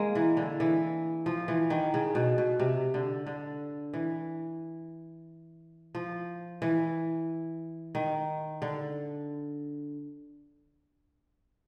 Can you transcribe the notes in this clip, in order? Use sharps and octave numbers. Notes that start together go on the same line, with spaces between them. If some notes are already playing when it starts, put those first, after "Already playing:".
Already playing: G#3 A#3
E3
D3
E3
F3
E3
D#3
C#3
B2
B2
C3
D3
D3
E3
F3
E3
D#3
D3